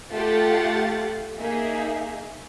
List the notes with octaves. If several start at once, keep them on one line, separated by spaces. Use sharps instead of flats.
A3 F4 G4 F5 F#5 A6
A#3 D#4 G#4 E5